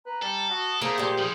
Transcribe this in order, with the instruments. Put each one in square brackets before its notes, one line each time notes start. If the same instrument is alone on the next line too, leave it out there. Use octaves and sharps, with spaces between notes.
[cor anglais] B4 [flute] A#5
[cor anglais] G3 [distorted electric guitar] A4
[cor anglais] F#4 [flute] D#6
[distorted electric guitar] A3 [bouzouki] A#3 [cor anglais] G#4 [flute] C5
[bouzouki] A#2 G4
[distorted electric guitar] E3 F3 [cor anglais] G#4